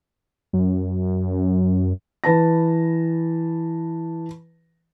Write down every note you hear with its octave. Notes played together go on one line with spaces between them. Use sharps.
F#2
E3 B4 A5 A#6